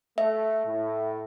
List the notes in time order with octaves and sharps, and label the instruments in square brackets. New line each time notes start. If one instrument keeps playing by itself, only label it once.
[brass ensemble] A3 [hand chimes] E5
[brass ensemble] A2